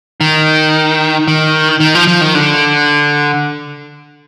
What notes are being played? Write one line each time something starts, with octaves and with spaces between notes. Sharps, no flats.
D#3
D#3
D#3
F3
F3
D#3
D3